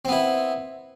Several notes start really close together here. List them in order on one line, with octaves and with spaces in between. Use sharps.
C4 B3 E4